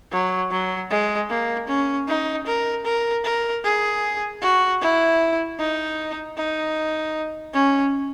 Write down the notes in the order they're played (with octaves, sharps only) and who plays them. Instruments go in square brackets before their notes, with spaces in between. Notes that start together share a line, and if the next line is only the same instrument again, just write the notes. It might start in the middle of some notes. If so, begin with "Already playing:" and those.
[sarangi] F#3
F#3
G#3
A#3
C#4
D#4
A#4
A#4
A#4
G#4
F#4
E4
D#4
D#4
C#4